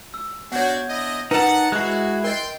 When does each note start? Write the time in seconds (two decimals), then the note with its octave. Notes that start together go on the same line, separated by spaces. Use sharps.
0.14 E6
0.52 B3 D4 F#4 C#5 F#5 G6 G#6
0.88 D4 E4 D#5
1.31 D#4 A#4 B4 F#5 A5 C#7
1.72 G#3 E4 F#4 F#6 C7
2.24 A#4 D#5 G5 C6